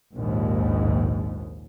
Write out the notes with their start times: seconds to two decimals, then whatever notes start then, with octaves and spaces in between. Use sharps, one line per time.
0.13 A#1 D#2 G#2